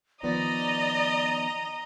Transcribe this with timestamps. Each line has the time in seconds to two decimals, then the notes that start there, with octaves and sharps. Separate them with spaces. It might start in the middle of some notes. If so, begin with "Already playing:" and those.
0.23 D#3 F3 B3 D5 D#5 A#5